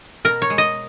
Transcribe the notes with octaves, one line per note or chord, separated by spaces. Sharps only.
B2 A#4
C#5
G#3
D#5